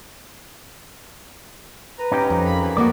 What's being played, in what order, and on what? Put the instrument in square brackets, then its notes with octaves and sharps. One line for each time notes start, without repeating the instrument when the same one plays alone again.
[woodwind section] B4 A#5
[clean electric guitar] C#4 D#4 G4
[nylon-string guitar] F2
[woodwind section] A#3 B5
F#2 E3
[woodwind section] D#3 [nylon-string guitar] A3 A#3 [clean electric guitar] F#4 D5